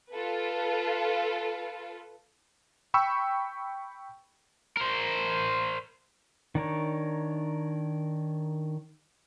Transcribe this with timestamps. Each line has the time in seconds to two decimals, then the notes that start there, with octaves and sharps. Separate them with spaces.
0.11 F4 A4 B4
2.94 G5 B5 C#6 E6
4.77 A#4 C5
6.55 D#3 D4 A#4 C#5